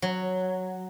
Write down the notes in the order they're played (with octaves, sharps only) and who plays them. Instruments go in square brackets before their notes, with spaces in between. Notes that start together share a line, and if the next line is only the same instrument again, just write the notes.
[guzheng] F#3